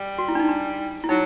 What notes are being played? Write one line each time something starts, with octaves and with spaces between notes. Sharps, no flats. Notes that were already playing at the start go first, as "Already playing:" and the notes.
Already playing: G3
F#4
E4
D4
D#4
D4
E4
F#3 D#4